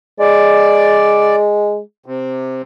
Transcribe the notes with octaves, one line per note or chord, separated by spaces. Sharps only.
G#3 D5
C3